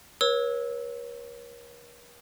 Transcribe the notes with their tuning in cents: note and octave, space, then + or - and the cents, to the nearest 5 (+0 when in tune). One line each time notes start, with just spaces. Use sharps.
A#4 +45 C#5 -15 E6 -20